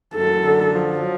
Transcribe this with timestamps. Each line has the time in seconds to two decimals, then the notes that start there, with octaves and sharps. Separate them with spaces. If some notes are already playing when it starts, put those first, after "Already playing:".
0.15 F#2 A4
0.42 D3
0.71 F3
0.98 F#3